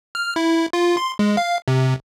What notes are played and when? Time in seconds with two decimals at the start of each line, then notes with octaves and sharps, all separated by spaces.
0.15 F6
0.36 E4
0.73 F4
0.97 C6
1.19 G#3
1.37 F5
1.68 C3